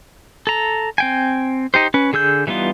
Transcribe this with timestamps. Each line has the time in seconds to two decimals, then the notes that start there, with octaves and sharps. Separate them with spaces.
0.47 A4 A#5
0.98 C4 G5 G#5
1.74 D#4 G4 C5
1.94 C#4 B4
2.13 D3 G#4 E6 G6
2.47 E3 G3 B3 D#4 F4